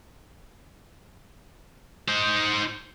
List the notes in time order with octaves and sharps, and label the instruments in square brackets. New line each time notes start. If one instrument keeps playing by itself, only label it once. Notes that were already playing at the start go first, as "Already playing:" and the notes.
[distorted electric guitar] D#4 C5